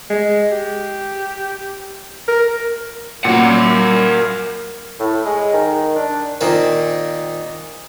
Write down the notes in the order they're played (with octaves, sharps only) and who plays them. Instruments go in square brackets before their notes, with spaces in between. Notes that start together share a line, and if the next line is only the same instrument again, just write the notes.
[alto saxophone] G#3
G4
A#4
[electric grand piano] A#2 F#3 A#3 [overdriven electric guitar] A#4 F#5
[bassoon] A2
G#3
D#3
D4
[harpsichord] A#2 D#3 C4